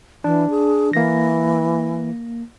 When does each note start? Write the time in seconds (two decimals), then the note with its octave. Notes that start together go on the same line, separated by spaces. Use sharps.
0.24 E3 D4
0.50 G#4
0.93 E3 A#3 A#6